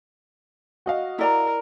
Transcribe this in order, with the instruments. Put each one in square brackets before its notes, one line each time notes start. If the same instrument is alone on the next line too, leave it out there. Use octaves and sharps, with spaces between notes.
[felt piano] F#4 D#5 F5
[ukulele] E4 D5 A#5 [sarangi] A#4